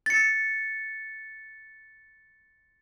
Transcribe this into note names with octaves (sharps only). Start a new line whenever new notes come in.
A6 C#7